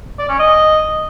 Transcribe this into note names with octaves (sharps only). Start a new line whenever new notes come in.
D5
C#4
D#5